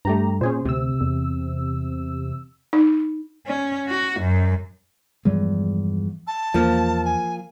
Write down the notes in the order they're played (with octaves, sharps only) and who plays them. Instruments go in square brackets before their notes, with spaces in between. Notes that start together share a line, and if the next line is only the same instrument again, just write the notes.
[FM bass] G2 [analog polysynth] A3 G4 A#5
[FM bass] A#2 [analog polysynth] C#4 G#4 C5
[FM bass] D2 [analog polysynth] C3 E6
[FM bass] E2
[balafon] D#4
[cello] C#4
F#4
F#2
[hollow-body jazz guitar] E2 [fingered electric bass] G2 F3 G#3
[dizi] A5
[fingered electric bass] E2 [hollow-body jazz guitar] F3 A#3
[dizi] G#5